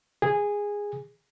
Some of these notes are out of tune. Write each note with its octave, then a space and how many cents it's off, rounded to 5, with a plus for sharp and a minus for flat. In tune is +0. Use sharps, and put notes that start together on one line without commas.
G#4 -10